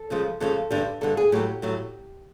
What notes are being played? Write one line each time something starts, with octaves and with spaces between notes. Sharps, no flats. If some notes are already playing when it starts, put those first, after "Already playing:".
Already playing: A4
F2 C#3 F3 G#3
F2 C#3 F3 G#3 A4
G2 D3 G3
G2 D3 G3 A4
G#4
A2 F#3 A3 G4
A2 F#3 A3